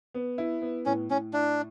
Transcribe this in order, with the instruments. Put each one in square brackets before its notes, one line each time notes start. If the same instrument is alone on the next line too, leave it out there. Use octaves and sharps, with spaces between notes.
[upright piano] B3
E4
B3
[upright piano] A2 [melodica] C#4
[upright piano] A2 [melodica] C#4
[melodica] D4 [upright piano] E4